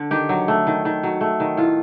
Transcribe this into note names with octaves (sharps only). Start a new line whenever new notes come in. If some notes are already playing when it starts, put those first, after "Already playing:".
Already playing: D3
D#3 G4
F#3
A3
D#3
D#3
F#3
A3
D#3
A2 F4